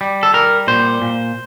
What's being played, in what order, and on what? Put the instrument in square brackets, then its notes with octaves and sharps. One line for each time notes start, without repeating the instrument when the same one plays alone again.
[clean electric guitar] G3
A4
G3 A#4
A#2 C5
A#2